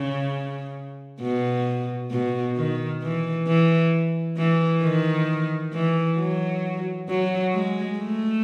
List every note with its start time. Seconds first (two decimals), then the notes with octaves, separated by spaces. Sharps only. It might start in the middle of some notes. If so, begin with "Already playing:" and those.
Already playing: C#3
1.21 B2
2.11 B2
2.56 D#3
3.02 E3
3.47 E3
4.37 E3
4.82 D#3
5.73 E3
6.18 F#3
7.09 F#3
7.54 G#3
7.99 A3